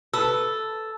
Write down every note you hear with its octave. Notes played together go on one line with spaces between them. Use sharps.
A4 B4 E6